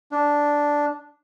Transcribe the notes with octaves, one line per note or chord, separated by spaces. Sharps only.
D4